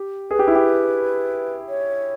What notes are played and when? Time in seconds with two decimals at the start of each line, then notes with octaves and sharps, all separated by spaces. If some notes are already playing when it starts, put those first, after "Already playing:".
Already playing: G4
0.31 G#4 B4
0.39 G4
0.48 E4
0.55 G4
1.69 C#5